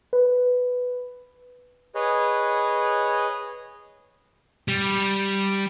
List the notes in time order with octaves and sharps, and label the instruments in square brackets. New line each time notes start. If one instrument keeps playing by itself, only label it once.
[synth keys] B4
[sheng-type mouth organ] G#4 B4 C#5 D#5
[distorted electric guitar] G3